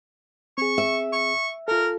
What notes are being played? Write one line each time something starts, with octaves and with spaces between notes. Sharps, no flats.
C4 G#4 C#6
E5
C#6
F4 A4 A#4